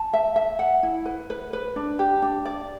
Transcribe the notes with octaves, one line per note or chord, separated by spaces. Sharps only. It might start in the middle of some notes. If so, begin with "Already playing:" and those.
Already playing: A5
E5
E5
F#5
E4
B4
B4
B4
D4
G4
D4
D5